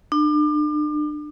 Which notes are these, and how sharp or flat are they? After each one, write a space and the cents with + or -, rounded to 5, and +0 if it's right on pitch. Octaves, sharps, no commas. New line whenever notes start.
D4 +35